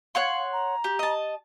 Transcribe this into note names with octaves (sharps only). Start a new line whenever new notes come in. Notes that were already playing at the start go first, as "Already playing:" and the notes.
C#5 F5 F#5 C6
A#5
G4
D#5 A5